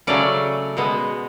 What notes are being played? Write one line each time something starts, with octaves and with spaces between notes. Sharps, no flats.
C#3 F#3 A3 C#4 D5
B2 G#3 B3